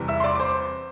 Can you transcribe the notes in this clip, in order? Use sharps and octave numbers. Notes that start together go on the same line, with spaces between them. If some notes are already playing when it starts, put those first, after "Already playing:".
Already playing: E2 C3 E3 G3
E5 E6
C6
D5 D6
D6
C5 C6